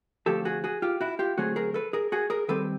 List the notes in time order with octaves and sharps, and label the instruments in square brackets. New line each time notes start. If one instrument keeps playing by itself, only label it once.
[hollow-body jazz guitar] D3 F3 A3 C4 G4 A4
F#4 G#4
F#4 G#4
F4 G4
E4 F#4
F4 G4
D3 F#3 A3 C4 F#4 G#4
G#4 A#4
A4 B4
G#4 A#4
F#4 G#4
G#4 A#4
D#3 G3 C4 A4 B4